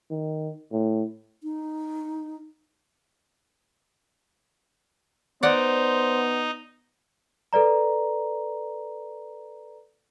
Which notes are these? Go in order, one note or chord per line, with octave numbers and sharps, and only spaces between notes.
D#3
A2
D#4
B3 D#4 C5 D5 F#5
A4 B4 D5 A#5